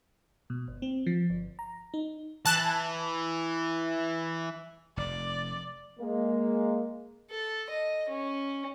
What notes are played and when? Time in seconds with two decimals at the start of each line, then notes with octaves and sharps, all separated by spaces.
0.50 B2
0.68 G1
0.82 C4
1.06 F3
1.30 G1
1.59 A#5
1.94 D#4
2.46 E3 A5 F#6
4.97 F1 D5
6.00 G#3 A#3
7.30 A4
7.69 D#5
8.09 C#4